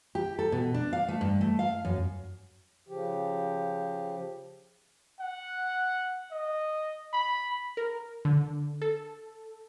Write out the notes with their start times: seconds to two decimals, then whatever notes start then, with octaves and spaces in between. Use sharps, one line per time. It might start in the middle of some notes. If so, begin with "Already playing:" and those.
0.15 G4
0.39 A4
0.52 B2
0.74 D4
0.93 F5
1.08 A3
1.21 G2
1.41 A3
1.59 F5
1.85 F#2
2.88 C#3 F3 G4
5.20 F#5
6.31 D#5
7.13 B5
7.77 A#4
8.25 D3
8.82 A4